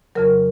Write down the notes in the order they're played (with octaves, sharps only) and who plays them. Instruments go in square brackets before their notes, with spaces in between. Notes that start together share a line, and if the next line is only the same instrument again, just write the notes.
[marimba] F2 C#3 F#3 A#4